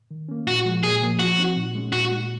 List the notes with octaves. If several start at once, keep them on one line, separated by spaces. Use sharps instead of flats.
D#3
A#3 C#4
A#2 F#4
F3 G#3
A#2 G#4
F3 A#3
F3 F#4
C4 D#4
A#2
G#3 C#4
A#2 F#4
G#3 D#4